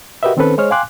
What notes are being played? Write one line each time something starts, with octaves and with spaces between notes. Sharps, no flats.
F#4 G4 A#4 B4 D#5 E5
D#3 C4 C#4 A4 B4 C5
G#3 G#4 C5 C#5 D#5 F6
F5 G5 G#5 C6 D6 F#6